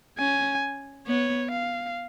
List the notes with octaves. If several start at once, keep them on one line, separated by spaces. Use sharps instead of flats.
C#4 G#5
B3 C#5
F5